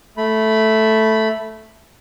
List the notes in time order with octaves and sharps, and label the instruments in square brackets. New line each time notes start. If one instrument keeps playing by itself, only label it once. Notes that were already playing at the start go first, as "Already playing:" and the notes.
[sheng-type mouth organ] A3 B5